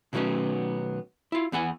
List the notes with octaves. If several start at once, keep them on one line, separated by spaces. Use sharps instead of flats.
B2 D#3 F#3 A3 B3 C#4
E4 F4
E2 B3 F#5 G#5